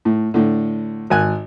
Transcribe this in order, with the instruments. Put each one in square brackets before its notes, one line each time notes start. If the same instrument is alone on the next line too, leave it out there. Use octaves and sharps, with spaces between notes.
[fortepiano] A2
A2 D3
G#1 G#5 F#6